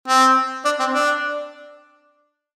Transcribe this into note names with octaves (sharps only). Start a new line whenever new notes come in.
C4
D4
C4
D4